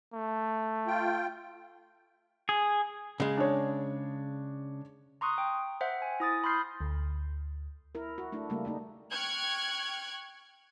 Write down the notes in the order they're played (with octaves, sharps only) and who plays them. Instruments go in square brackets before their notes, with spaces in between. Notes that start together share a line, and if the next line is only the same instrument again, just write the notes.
[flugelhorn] A3
[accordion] F4 G5
[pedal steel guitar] G#4
[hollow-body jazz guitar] C#3 G#3
[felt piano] D4 C#5
[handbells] A#5 C6 C#6 D#6 F#6
G5
C5 E5 F#5
G#5
E4 D#6 A6
B5 C6 D#6 F6 G6 C7
[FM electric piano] D2
[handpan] E4 A#4
F#4
A3 D4 E4
C#3 G3 A3 A#3
A3 A#3 D#4
[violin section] G5 C#6 F6 F#6 G#6